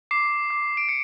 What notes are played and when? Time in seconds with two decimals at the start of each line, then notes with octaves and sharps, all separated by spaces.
0.11 D6 C7
0.50 D6
0.77 D7
0.89 C#7